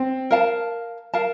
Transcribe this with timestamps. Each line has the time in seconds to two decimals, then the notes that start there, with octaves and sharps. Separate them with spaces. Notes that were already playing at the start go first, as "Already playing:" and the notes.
Already playing: C4
0.31 A#4 F5 A5
1.14 A#4 F5 A5